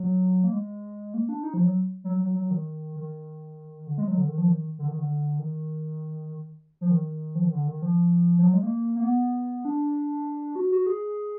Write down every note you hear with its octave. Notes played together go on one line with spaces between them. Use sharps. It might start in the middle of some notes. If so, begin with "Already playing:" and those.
Already playing: F#3
A#3
G#3
A#3
D4
D#4
F3
F#3
F#3
F#3
F#3
D#3
D#3
D3
G#3
F#3
D3
D#3
F3
D#3
D3
D#3
D3
D#3
F3
D#3
F3
D#3
D3
D#3
F3
F3
F#3
G#3
A#3
A#3
B3
D4
F#4
F#4
G#4